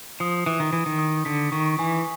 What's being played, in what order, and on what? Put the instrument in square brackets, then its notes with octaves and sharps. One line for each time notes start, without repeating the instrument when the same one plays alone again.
[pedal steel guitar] F3 [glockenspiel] D#6
[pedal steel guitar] E3 [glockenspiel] D#6
[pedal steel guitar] D#3
[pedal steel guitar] E3 [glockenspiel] D#6
[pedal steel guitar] D#3
[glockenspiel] D#6
[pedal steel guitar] D3 [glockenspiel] B6
[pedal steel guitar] D#3 [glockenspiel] C#6
[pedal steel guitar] E3 [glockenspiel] G#5